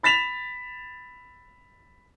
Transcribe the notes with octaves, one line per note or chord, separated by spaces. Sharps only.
B5 A6 B6 E7 F7